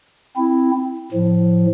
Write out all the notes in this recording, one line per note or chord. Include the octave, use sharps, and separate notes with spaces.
C4 E4
A2 F3